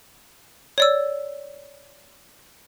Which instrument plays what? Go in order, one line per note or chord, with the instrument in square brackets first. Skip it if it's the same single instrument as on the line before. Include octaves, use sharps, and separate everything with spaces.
[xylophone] C#5 D5 E6